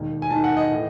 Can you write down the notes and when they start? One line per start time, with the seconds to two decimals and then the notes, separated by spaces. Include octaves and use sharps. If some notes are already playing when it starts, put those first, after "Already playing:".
Already playing: E1 D#2 D#3
0.22 G#5
0.30 E1 D#2 D#3 A5
0.44 F#5
0.57 D#5
0.72 A2 E3